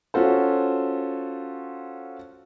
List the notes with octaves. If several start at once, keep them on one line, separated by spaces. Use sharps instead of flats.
C#4 F4 F#4 A4 C5